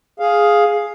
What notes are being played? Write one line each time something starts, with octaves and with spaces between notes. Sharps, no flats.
G#4 F5